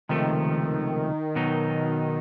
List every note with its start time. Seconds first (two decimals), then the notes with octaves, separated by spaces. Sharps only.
0.09 C#2 C3 D#3 F3 A3
1.35 B2 F#3 B3 D#4